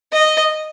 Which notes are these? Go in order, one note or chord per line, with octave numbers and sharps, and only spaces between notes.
D#5